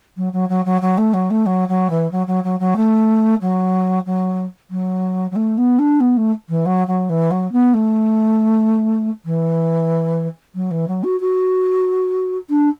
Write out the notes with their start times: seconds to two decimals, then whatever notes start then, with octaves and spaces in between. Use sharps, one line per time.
0.17 F#3
0.33 F#3
0.49 F#3
0.65 F#3
0.81 F#3
0.98 A3
1.13 F#3
1.30 A3
1.46 F#3
1.68 F#3
1.90 E3
2.11 F#3
2.27 F#3
2.44 F#3
2.60 F#3
2.76 A3
3.41 F#3
4.06 F#3
4.71 F#3
5.31 F#3
5.36 A3
5.58 B3
5.79 D4
6.00 B3
6.17 A3
6.49 E3
6.66 F#3
6.87 F#3
7.09 E3
7.31 F#3
7.52 B3
7.74 A3
9.25 E3
10.55 F#3
10.71 E3
10.88 F#3
11.04 F#4
11.20 F#4
12.50 D4